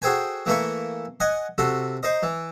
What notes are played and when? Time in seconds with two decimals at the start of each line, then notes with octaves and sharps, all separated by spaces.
0.02 F#4 G#4 A4 C5 G5 G#5
0.46 E3 A3 A#3 E4 A4 C#6
1.20 D#5 F#5 G#5
1.58 C3 F#4 A4
2.03 D#4 C5 D#5
2.23 E3